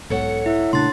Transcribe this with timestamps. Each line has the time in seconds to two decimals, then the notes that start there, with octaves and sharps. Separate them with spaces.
0.10 B1 G#2 B2 A4 C#5 F#5
0.46 E4 E5
0.73 A#2 C#3 A3 D4 C6 A6